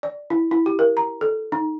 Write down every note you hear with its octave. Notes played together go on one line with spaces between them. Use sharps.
D5
E4
E4
G4
A#4
A#5
A4
D#4